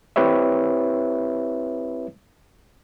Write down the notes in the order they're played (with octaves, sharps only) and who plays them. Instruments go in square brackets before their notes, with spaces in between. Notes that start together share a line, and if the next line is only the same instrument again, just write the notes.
[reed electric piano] C4 E4 G4 B4 C#5 E5